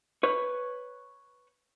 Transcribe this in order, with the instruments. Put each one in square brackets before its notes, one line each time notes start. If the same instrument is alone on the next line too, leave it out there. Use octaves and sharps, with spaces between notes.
[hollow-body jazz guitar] B4 C#5